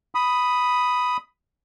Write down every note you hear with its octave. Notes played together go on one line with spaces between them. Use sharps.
B5 D#6